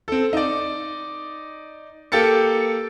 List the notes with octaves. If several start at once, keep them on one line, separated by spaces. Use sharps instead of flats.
C4 A4
D#4 D5
A#3 G4 A4 A6 C#7